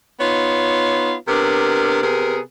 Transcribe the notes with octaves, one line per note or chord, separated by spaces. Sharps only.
B3 D#4 F4 C#5
C3 B3 D4 A#4
C3 B3 G#4 A#4